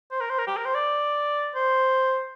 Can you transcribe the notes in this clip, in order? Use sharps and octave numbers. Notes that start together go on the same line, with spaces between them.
C5
A#4
C5
A#4
G4
A#4
C5
D5
C5